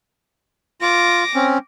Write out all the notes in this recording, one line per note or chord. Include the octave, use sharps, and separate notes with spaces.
F4 D6 A#6
C4 C#4